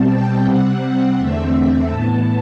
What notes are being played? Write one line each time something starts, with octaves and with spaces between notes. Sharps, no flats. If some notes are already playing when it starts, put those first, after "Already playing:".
Already playing: B2 G3 C4 A5
G5
C3 G3 C4 F#5
F#5
E2 D3 A3 C4 E5
A2 E3 B3 A5